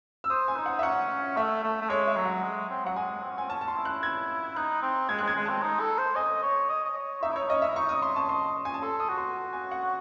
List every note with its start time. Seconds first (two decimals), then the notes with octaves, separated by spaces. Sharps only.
0.24 E6
0.30 C5 D#6
0.48 G#5
0.57 D#4
0.66 F#5
0.79 E5
0.83 C#4 F#5
1.37 A3 E5
1.63 A3
1.82 A3
1.90 G#3 C#5
2.07 E5
2.16 F#3
2.25 F#5
2.43 G#3
2.70 C4
2.85 F#3 F#5
2.96 G#3 G#5
3.23 C4
3.30 C#4
3.37 C4 G#5
3.50 C#4 A5
3.61 A5
3.68 C6
3.76 E4
3.85 F#6
4.03 G#6
4.56 D#4 F#6
4.82 C4
5.09 G#3 G#6
5.19 F#6
5.23 G#3
5.28 G#6
5.36 G#3
5.45 C4 A5
5.63 D#4
5.80 A4
5.99 C5
6.16 D#5 G#5
6.43 C#5
6.69 D#5
6.84 D#5
6.96 C#5
7.23 D#4 E5
7.31 E4
7.36 D#4 C#5
7.49 C#4 D#5
7.62 E5
7.67 E4
7.76 D#4 C#6
7.89 D#6
7.95 D#5
8.02 C#5 C6
8.16 A5
8.29 D#5 C6
8.65 G#5
8.74 A5
8.82 A4 C6
9.00 D#6
9.09 F#4
9.18 C6
9.53 G#5
9.71 F#5